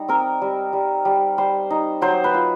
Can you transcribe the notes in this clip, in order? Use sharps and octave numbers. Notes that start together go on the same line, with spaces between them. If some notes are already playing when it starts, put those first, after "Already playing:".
Already playing: G3 D#4
C4 A#4
G3
G3
G3
G3 C5
D#4
F#3 C5
B4
F4